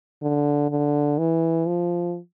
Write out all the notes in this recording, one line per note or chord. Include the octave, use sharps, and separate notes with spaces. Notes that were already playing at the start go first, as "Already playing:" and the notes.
D3
D3
E3
F3